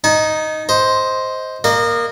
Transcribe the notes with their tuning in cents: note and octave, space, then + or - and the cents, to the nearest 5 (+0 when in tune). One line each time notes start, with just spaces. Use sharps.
D#4 +0 G#5 +45
C5 +0 D#5 +15
A#3 +0 D#5 -30